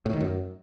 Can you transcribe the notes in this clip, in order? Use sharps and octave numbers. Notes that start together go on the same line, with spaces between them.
A2
D#3
F#2